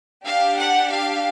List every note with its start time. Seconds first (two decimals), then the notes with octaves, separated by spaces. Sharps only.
0.25 D4 G4 F5
0.58 F#5
0.91 F5